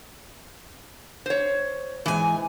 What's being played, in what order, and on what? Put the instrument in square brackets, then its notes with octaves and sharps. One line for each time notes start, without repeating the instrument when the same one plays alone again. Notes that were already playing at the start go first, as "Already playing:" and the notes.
[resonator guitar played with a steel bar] C5 C#5
[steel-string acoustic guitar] G#2 G#5 [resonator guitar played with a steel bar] E3